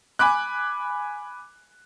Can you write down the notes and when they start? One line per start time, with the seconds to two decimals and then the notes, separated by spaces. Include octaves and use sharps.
0.19 G#5 B5 D6 F#6